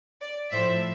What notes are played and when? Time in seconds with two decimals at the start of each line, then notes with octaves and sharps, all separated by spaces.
0.21 D5
0.52 A2 F3 C5 E5